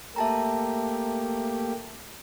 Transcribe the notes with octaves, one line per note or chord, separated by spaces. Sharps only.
A3 A#3 G4 E5 A5 A#5